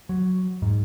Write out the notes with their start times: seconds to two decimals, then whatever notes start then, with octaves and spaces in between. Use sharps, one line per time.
0.09 F#3
0.62 G#2